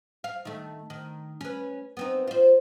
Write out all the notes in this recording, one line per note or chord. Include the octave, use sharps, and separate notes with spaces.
F5
D#3 A3
D#3
C#4 B4
B3 C4 D#4
F4 C5